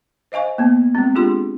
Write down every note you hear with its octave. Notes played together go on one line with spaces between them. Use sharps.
C5 D#5 F5 G#5 C#6
A#3 B3
G#3 C4
G#3 D4 F4 G4 G#4 C6